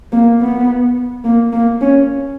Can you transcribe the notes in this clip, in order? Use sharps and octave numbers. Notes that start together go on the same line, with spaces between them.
A#3
B3
A#3
A#3
C#4